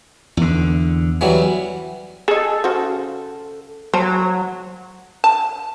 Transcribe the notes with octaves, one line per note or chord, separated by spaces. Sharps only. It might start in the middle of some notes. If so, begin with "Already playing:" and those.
E2 D3
E3 F#3 G3
G#4 A4 D#5
C#3 F#4 C5
F#3 C5 A5
A5